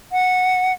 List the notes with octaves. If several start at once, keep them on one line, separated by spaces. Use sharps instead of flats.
F#5